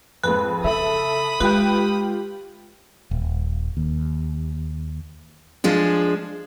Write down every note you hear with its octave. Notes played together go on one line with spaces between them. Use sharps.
F2 G#2 B4
C#3 A4 E5 B5 D#6
G#3 F4 G4 B4 G5
D#1
D#2
F3 G#3 D4